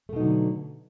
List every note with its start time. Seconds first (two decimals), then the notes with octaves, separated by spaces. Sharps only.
0.09 A3
0.13 B2
0.16 D#4
0.20 F#3
0.23 D3